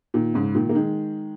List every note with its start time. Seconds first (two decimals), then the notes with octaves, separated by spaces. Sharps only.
0.14 A#2 D#3
0.34 G#2 C#3
0.55 A#2 D#3
0.69 A#3
0.75 D#3 G#3